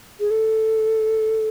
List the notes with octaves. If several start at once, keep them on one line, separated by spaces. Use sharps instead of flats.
G#4
A4